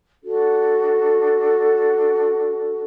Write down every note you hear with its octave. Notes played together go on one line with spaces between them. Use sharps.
D4 F#4 A4